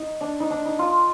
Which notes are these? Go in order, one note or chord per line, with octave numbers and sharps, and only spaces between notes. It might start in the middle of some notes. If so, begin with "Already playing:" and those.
Already playing: D#4
D4
D#4
D4
D#4
F4